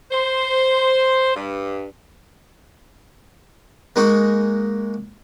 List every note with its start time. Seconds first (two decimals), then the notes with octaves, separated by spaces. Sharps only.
0.11 C5
1.35 G2
3.96 G#3 A#3 D#4 F#4